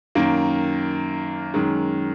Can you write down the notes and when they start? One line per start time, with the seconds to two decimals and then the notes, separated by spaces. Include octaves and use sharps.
0.15 F#2 D#3 A#3
1.54 F#2 D#3 G#3